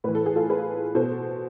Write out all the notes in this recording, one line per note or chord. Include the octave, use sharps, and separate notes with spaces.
A2 E3 B4
A4
G#4
F4 A4
G#4 B4
B2 A4 C5